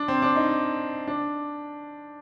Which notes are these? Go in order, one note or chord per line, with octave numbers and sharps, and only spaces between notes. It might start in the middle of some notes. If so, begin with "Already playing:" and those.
Already playing: D4
C4
D4
D#4
D4